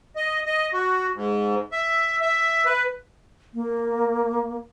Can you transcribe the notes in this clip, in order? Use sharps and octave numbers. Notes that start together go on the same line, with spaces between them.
D#5
D#5
F#4
G#2
E5
E5
B4
A#3